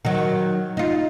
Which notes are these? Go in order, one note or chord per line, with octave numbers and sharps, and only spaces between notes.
D#3 F#3
D#4 F4